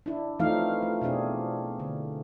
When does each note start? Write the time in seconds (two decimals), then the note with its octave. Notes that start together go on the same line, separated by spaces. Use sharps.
0.06 D4 E4
0.39 E3 F3 A3 C4 D#4 F5
0.83 A3
1.01 B2 C4 D4 G#4
1.80 D3